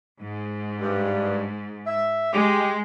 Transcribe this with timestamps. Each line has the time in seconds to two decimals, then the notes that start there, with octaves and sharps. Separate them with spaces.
0.20 G#2
0.79 G2
1.86 E5
2.33 G#3 G4